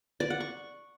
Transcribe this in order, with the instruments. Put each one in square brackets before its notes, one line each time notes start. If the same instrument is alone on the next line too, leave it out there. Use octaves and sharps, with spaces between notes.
[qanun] D5
F#5
C#6